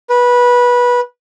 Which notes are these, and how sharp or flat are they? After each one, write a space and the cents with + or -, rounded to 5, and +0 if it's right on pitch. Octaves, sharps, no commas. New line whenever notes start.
B4 -20